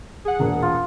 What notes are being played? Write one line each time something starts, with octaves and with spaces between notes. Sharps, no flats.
G#4 F#5
E1 A#2
F4